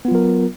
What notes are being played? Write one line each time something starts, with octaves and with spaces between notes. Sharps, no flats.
F#3 B3 F4 A#4